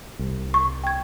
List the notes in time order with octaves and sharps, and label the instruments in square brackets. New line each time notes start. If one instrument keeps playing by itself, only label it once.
[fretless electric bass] C2
[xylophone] C#6
G5 G#6